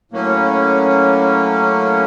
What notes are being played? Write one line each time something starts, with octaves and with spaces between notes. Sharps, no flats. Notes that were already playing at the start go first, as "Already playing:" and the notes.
A2 F#3 A#3 C#4